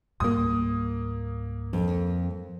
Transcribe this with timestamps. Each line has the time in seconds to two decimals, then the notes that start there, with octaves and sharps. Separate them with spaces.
0.20 C#2 G#2 G3 A#3 D#6
1.73 F2